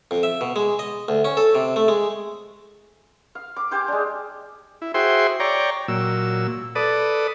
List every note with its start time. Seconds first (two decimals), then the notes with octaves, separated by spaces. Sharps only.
0.11 F2
0.23 E5
0.41 B2
0.56 G#3
0.79 D#5
1.08 D2
1.25 C#4
1.37 A4
1.55 C3
1.76 A3
1.88 G#3
3.35 F5
3.56 D6
3.71 G4 C5 G#5 D6
3.88 G#3 D4
4.82 E4
4.94 F#4 G#4 C5 E5 G5 C6
5.40 C#5 D5 G5 A#5
5.88 A#2 F#3 E6
6.75 A4 B4 D5 D#6